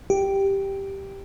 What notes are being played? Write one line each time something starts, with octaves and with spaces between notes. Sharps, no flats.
G4